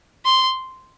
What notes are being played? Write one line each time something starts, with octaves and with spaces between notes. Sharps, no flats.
C6